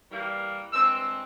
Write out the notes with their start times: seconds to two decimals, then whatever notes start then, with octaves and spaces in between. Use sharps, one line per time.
0.11 E3 G3 A#3
0.73 G2 E3 G#3 C4 E6